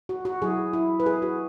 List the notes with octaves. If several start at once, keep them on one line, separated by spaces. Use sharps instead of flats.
F#4
F#4
F#3 E4 G#4
E4
B4
G#4
F#4